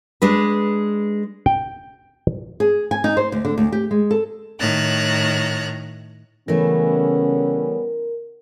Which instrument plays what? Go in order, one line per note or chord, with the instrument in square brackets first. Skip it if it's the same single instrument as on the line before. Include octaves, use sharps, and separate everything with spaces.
[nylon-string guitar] G#3 D4 B4
[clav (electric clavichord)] G5
[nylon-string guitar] G#4
G#5
D#4
C5
D2
D3
D2
G4
G#3
A4
[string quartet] A2 D#3 C#5 A#5 F#6 A6
[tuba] C#3 [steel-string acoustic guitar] E3 A3 [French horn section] G3 B3 C#4 [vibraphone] A#4